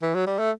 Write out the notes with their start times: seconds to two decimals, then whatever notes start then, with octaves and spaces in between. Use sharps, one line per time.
0.02 E3
0.14 F#3
0.26 G3
0.39 A3